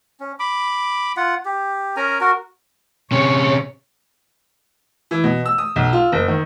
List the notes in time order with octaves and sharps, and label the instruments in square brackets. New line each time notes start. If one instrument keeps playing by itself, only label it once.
[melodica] C#4
B5 D6
F4 F#5
G4
C#4 A#4 G#5 A#5
F#4 A#4
[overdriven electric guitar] C3 C#4 [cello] C#5
[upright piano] E3
B2
E6
D#6
B1
F4
F#1
D#3